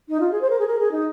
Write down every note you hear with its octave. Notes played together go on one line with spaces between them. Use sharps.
D#4
F4
G#4
C5
A#4
G#4
A#4
G#4
D#4